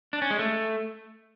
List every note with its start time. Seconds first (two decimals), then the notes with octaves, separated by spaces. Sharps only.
0.13 D4
0.22 C#4
0.30 G#3
0.39 A3